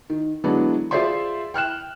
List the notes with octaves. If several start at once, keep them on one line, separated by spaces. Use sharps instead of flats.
D#3
D3 E3 F#3 G#3 B3 D4
F4 G#4 C5 D5 E5 C6
G5 F6 F#6 E7